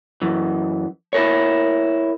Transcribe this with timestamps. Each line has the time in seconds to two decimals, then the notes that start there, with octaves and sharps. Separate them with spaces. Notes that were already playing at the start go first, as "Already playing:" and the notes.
0.22 F#2 E3
1.13 E4 A#4 C#5